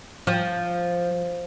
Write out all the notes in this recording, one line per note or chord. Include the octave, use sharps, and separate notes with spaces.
F3